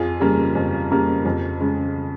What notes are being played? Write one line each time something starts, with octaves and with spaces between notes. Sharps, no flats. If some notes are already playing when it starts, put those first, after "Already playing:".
Already playing: F2 F4 G#4
C#3 G3 A#3
F2
C#3 G3 A#3
F2
C#3 G#3